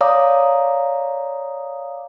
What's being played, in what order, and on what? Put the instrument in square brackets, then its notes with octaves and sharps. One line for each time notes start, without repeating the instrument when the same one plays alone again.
[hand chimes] C#5 D5 F5 A#5 D6 D#6